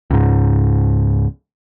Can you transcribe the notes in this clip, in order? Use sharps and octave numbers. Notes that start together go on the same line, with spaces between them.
C#2 G#2